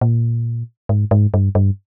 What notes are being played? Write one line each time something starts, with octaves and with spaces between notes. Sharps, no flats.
A#2
G#2
G#2
G2
G2